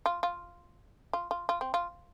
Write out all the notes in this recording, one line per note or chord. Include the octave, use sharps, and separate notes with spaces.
F4
F4
F4
F4
F4
C4
F4